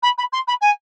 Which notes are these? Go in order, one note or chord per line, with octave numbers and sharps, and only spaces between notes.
B5
B5
C6
B5
G#5